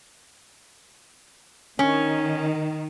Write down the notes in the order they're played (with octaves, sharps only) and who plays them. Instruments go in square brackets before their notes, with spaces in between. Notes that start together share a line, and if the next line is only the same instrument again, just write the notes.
[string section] D#3 [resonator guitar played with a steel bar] C#4